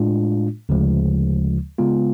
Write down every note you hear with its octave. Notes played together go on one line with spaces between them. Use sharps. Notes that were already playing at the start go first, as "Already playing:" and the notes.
Already playing: A2 G#3 D4 F4
D2 C#3 F3 G#3
C#3 G#3 B3 F4